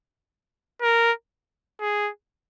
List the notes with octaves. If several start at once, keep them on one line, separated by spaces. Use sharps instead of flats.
A#4
G#4